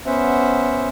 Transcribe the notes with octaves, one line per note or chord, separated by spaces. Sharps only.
B3 C#4 C5 E5 F#5